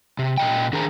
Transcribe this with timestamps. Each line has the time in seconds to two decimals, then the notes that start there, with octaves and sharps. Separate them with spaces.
0.19 C3
0.38 A#2 D#5 G5
0.73 D#3 D4 G#4 A#4 C5 A#5